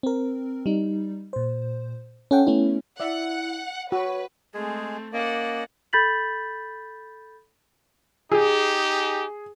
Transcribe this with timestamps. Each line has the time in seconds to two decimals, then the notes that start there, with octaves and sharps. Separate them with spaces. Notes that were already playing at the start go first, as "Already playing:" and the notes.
0.03 C4 A#4
0.66 G3 D#4
1.33 A#2 C5
2.31 C#4 A4 F#5 G5
2.47 A3 B3 C#4 E4
3.00 E4 D5 E5 F#5
3.92 F#4 B4 C#5
4.54 G#3 A3 C4 G#4
5.13 A#3 C#4 D5 D#5 F#5
5.93 A4 B5 G6 A6 B6 F#7
8.32 D#4 G4 G#4